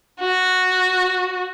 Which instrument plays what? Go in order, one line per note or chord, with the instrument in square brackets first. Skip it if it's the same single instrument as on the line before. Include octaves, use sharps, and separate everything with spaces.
[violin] F#4